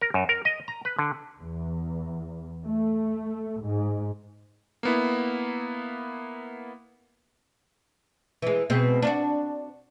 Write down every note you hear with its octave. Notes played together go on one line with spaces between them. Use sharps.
A#4
F#2
A#4
D#5
A#5
B4
D3
E2
A3
G#2
A#3 B3 E4
E3 G#3
B2 G#3 C4
D4 F4 F#4